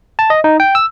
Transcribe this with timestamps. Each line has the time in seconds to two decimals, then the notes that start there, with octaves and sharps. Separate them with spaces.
0.19 A5
0.30 D#5
0.44 D#4
0.60 G5
0.75 E6